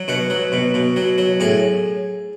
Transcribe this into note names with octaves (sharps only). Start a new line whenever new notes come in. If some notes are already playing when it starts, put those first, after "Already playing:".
Already playing: F#3
B2 F#4
F#3
B2
B2
F#3
F#3
A2 G#4